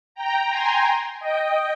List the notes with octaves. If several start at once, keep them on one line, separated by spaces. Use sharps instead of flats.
G5 A#5
G#5 C6
D#5 G5